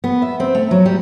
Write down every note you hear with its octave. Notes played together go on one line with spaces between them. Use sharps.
B3
E5
C4
A3
F#3
G3